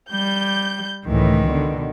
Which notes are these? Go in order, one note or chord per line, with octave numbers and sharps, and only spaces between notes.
G3 G6
C#2 A2 D#3 E3
B2 D3